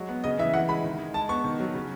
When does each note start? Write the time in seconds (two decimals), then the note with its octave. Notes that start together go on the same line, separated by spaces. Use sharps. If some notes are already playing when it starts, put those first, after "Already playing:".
Already playing: F#3 G#3
0.09 B3
0.24 C#3 D#5
0.39 E3 E5
0.53 E3 F#5
0.69 G#3 B5
0.84 D#3
0.99 G#3
1.14 G#3 A5
1.29 B3 C#6
1.44 D#3
1.60 F#3
1.74 C#3